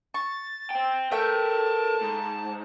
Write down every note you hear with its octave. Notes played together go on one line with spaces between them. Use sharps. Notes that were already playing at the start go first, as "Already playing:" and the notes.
C#6 A6
C5 G5
A3 A#4 B4 G5 A5
G#2